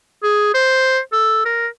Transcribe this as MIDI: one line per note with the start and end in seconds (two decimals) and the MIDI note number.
0.23 0.54 68
0.54 0.99 72
1.12 1.44 69
1.45 1.67 70